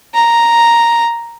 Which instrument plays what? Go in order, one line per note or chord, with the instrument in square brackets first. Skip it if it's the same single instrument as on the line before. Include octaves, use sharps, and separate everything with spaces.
[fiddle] A#5